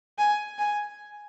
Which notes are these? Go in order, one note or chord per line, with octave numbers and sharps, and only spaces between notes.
G#5
G#5